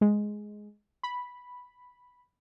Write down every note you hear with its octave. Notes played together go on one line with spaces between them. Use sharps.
G#3
B5